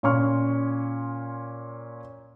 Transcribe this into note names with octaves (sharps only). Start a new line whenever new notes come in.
A#2 C#4 C6 C#6 F6